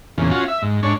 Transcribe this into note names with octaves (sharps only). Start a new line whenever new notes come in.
E2 A#2 C#3
C#4 F4 F#4
E5
G#2
G#2 D4 C#5